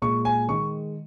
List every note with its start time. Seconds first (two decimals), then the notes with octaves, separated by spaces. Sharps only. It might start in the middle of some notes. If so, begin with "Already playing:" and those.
0.02 A#2 G#3 C#6
0.25 G#5
0.48 D#3 G#3 C#6